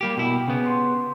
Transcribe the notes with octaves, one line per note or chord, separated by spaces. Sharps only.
G3 A#3 G4
B2 E4 G4
C#3 B3
C6